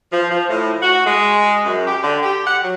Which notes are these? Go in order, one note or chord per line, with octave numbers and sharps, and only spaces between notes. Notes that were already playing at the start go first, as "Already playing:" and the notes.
F3
F3
A2
F#4
G#3
F#2
G4
D3
G4
F#5
F#3